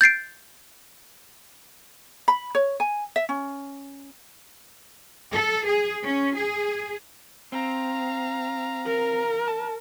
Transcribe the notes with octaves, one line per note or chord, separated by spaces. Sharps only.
G6 A6 C7 D7
B5
C#5
G#5
E5
C#4
A4
G#4
C#4
G#4
C4 F5 A#5
A#4
A5